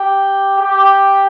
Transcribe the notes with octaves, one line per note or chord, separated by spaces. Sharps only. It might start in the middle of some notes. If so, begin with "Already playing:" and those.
Already playing: G4 G5
G4 G5